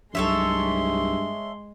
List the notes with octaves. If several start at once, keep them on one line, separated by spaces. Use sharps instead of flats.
C2 G2 F#3 G#3 A4 C#5 E5 C6